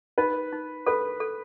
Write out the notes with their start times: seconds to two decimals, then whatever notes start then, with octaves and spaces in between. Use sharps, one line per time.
0.18 D#4 B4
0.52 D#4
0.87 A4 B4
1.20 A4